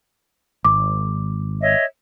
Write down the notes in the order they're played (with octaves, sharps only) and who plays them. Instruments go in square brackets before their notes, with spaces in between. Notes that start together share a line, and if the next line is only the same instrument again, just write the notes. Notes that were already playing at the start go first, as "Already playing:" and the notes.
[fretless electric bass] G#1 [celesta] D6
[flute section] C#5 D#5 E5